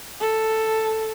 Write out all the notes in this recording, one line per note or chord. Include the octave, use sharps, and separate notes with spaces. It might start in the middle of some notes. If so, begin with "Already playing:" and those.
A4